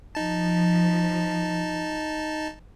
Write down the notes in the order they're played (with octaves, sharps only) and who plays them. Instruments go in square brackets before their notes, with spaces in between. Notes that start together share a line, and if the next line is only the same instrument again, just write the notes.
[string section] F3 [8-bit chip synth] D#4 A5